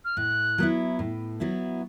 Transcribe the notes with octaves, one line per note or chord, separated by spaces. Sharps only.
F6
A2 F#6
F#3 B3 E4
A2
F#3 B3 E4